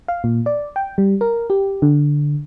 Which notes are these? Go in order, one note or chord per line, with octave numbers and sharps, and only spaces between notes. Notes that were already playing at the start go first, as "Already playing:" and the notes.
F5
A#2
D5
G5
G3
A#4
G4
D3